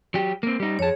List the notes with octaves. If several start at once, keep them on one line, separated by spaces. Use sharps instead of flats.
F#3 G4
A#3 C4
G3 D#4
F2 G#4 C#5 A5